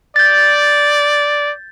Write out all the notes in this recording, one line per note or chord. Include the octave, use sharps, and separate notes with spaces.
D5 G6 A6